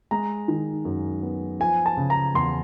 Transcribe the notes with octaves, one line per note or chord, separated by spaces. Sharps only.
G#3 A#5
D#3
F#2
B3
F3 G#5
A5
C#3
A#5
E2 C6